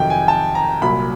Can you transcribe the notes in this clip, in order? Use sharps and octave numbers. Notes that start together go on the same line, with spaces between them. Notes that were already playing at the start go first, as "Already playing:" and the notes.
Already playing: F2 C3 D#3 F#3 G5
G#5
A5
A#5
C2 A#2 F#3 B5